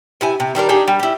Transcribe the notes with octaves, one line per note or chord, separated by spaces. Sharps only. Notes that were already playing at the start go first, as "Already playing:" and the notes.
C3 E4 G#5
C3
D#3 G3 D4 A#4
D4 D#4 G4 G#4
G3
E4 G4